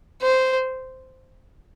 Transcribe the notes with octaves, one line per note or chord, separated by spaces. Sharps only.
C5